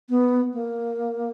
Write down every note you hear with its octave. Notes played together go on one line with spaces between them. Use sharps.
B3
A#3